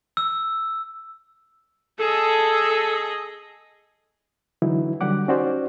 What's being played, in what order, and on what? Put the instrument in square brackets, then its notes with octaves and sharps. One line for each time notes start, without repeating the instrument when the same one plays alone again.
[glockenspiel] E6
[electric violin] G#4 D#5 [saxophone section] A4
[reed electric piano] D3 E3 F#3 D#4 E4
D3 F#3 G3 G4 F#5 D6
C#4 D#4 F#4 G4 C5 D5